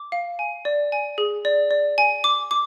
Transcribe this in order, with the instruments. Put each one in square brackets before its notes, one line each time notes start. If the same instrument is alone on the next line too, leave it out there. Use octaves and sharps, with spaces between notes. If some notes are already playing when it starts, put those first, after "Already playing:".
Already playing: [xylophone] D6
F5
G#5
D5
G#5
G#4
D5
D5
G#5
D6
D6